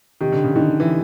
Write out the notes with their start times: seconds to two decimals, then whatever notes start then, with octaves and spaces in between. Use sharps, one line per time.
0.21 C3 D#3
0.32 D3
0.44 C#3
0.56 D3 D#3
0.80 E3